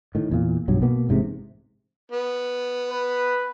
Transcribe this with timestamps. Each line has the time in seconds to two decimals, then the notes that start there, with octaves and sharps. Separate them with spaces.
0.15 A2 D#3
0.31 E2 A#2
0.68 B1 G2 F#3
0.82 B2 A#3 B3
1.09 A1 G#2 C3
2.12 B3
2.91 B4